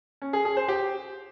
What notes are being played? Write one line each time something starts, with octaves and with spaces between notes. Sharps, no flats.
C#4
G#4
G#4
C5
G4